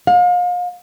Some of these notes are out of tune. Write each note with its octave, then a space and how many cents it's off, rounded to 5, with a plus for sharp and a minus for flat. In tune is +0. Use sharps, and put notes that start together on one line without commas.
F5 +35